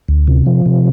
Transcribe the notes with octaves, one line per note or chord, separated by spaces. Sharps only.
D2
C3
F3
C3